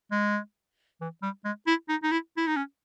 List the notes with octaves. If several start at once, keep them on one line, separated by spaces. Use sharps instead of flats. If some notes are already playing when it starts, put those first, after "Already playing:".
G#3
E3
G3
G#3
E4
D#4
D#4
E4
E4
D#4
C#4